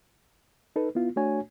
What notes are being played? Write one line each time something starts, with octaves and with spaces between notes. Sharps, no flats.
D#4 A4 B4
B3 E4 F4
A3 D4 F#4 C#5 G#5